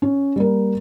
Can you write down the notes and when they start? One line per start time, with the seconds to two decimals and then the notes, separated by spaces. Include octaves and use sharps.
0.02 C#4
0.36 G3 A#3 A#4